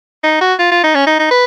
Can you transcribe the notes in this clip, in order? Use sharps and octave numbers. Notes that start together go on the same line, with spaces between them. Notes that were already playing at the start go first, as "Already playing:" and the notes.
D#4
F#4
F4
F4
D#4
C#4
D#4
D#4
B4